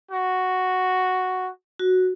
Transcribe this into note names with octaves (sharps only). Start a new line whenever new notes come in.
F#4
F#4